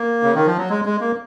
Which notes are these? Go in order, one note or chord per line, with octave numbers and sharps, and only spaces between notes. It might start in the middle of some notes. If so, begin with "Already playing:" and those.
Already playing: A#3
C#3
D#3
F3
F#3
G#3
G#3
A#3